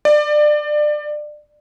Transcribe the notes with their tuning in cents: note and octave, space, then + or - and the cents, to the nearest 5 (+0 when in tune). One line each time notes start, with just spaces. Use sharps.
D5 +25